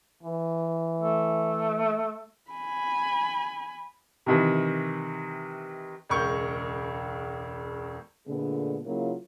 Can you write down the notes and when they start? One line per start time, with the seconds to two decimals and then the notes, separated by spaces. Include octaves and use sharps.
0.23 E3
0.99 A3
2.51 G#5 B5
4.26 C3 D#3 E3
6.09 E1 C#2 A#4 C#6 G6
8.26 A#2 D3 G#3 A3 B3
8.84 C#3 F#3 A#3 E4 F4